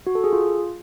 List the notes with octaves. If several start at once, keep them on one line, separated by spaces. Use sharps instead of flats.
F#4
A4
G#4
F4